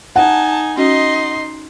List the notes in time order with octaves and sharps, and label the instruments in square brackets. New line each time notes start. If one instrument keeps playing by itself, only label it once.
[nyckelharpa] D#4 G#5 [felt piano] F#5 [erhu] A5
[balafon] C#4 F#4 [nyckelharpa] D#4 C6 [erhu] D#5